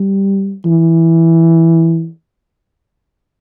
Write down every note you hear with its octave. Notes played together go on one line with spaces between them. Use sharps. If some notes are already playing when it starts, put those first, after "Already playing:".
Already playing: G3
E3